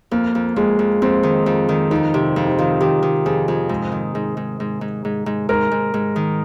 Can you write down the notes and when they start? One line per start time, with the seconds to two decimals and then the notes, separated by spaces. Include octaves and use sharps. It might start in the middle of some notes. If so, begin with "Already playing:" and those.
0.11 F2 A#3
0.35 F2
0.56 F2 G#3
0.79 F2
1.02 F2 C4
1.23 D#3
1.46 F2
1.69 D#3
1.90 F2 D#4
2.14 C3
2.36 F2 F4
2.47 D#4
2.58 D#3 F4
2.81 D#3 G4
3.03 D#3
3.26 F2 G#4
3.48 F2
3.69 G#2
3.92 D#3
4.15 G#2
4.37 G#2
4.60 G#2
4.81 G#2
5.05 G#2
5.26 G#2
5.49 G#2 A#4
5.72 G#2
5.94 G#2
6.16 D#3